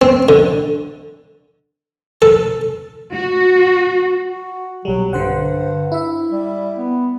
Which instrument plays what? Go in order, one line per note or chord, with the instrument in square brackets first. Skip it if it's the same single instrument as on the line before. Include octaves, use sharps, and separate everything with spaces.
[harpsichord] C4
D3
A4
[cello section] F#4
[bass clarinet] F#4
[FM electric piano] B1 G3 [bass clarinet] F#3
[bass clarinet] G2 [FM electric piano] D3 C5 F#5
[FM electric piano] E4 E5
[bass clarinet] G3
B3